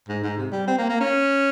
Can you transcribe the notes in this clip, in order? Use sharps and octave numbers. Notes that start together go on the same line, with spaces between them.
G#2
G#2
C3
G3
C4
A#3
A#3
C#4